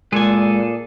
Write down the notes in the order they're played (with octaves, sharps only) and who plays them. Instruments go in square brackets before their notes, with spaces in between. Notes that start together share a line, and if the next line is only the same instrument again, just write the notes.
[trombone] A#2 [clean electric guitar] G#3 G#5 [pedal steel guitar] G#4 A4 D5